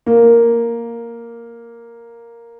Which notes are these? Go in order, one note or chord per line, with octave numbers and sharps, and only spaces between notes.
A#3